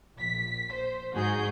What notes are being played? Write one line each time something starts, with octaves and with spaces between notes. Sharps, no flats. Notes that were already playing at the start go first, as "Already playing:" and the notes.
A#1 B6
C5
G#2 F#4 G#4 G6